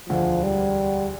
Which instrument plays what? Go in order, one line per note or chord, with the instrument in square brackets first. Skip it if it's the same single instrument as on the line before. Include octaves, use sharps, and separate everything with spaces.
[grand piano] E1 D2 D3 [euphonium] F3
[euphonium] G3